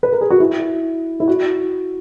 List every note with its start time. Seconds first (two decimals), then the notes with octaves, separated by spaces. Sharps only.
0.03 B4
0.13 A#4
0.21 G#4
0.30 F#4
0.40 E4
1.20 E4
1.28 F#4